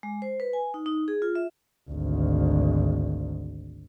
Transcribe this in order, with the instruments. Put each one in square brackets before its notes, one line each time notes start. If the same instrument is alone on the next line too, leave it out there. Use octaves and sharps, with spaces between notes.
[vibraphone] G#3
C5
B4
G#5
D#4
D#4
G#4
F4
E5
[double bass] G#1 D2